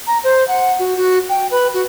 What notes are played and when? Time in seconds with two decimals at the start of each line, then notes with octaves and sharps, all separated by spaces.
0.07 A#5
0.24 C5
0.48 F#5
0.79 F#4
0.96 F#4
1.29 G5
1.51 B4
1.74 F#4